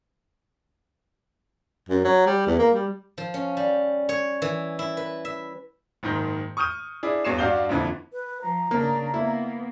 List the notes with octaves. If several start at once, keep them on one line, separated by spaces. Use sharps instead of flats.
F#2
F#3
G3
E2
A#3
G3
F3
C#4
G3
C#5
E3
E4
B4
E5
F#1 G#2 D#3 G6
C#6 D#6 F6 G6 D#7
D4 E4 G#4
E2 G2 F#4 C#5 C7 E7
G2 D4 F#4 F5 G6 G7
A#1 F2 D3 E3 F3
B4
F3 A#5
C#3 A#3 D4
A#3 B3 E4